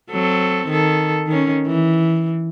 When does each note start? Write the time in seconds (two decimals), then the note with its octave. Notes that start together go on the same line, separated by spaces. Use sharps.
0.10 F#3 C4 A4
0.68 D#3 A4
1.27 D#3 C#4
1.66 E3